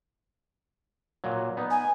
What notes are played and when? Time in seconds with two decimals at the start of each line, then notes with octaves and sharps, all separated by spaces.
1.24 A#2 F#3
1.57 B3 D#4
1.71 G#5